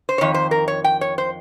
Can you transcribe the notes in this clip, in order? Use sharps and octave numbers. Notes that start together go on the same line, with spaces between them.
C5
F2 D#3 C#5
C5
A#4
C#5
G5
C#5
C5